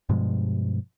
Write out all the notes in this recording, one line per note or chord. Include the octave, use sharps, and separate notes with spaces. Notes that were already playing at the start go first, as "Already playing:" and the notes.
G2 B2 F3 G#3